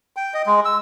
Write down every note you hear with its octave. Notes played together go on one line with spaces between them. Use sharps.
G5
D#5
G#3
E6